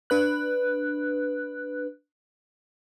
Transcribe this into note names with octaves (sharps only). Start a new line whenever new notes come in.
D4 B4 F#6